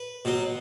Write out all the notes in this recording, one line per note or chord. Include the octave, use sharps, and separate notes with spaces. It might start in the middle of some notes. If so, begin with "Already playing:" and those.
Already playing: B4
B2 F#3